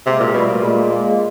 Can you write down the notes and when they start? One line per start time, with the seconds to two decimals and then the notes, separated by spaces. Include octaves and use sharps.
0.06 C3 G#3 A#3
0.20 A#2
0.34 B2 G3 A3
0.48 A#2
0.63 G#3 A#3
0.90 G#3 A#3